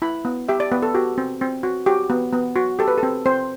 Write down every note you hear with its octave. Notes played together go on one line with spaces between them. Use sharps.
E4 B5
B3
G4 E5
D5
B3 B4
A4
F#4 G4
C4
C4
F#4
F#4 G4
B3
B3
F#4
G4 A4
B4
A4
C4
C4 C5